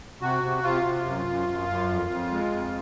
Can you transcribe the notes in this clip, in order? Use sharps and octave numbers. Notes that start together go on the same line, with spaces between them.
C3 F#4
C3
C3 F4
C3
F#2
F#2
F#2
F#2
F2
F2
G#3
F2